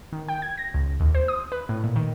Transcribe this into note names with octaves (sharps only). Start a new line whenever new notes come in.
D#3
G5
G#6
A#6
C#2
D#2
C5
D#6
B4
A2
A#2
D#3